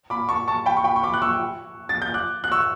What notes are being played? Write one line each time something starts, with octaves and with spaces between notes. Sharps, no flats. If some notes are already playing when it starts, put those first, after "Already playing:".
B5 D6
A5 C#6
A5 C#6
G5 B5
C#6
G5 B5
C#6
B5 D6
F#6
C#6 E6
A6
G6
D6 F#6
F#6
C#6 E6